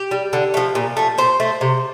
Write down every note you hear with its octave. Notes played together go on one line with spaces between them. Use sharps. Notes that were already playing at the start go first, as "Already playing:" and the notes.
Already playing: G4
G3
D3
F3 A3
A#2
F3 A3
A#2 C5
A3
C3